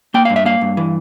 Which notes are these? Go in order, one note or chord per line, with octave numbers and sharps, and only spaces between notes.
A#3 G5
G2 F5
E5
A#3 F5
G2
E3